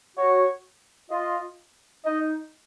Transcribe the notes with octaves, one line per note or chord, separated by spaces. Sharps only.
F#4 C#5
F4 D#5
D#4 D#5